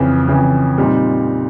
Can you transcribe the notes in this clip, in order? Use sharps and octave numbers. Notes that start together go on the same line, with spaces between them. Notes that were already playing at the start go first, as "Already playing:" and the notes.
Already playing: F2 C#3 E3
F2 C#3 E3
A#2 G3 C4 D#4